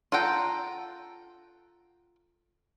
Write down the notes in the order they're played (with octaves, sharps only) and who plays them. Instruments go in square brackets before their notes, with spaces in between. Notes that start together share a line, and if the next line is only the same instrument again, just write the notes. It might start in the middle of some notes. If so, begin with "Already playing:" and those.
[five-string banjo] F4 A4 F#5 G5 A#5